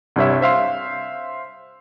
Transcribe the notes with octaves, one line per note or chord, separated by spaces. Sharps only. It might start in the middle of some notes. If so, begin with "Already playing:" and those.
C2 G2 C#5 E5
C5 E5 F5 C6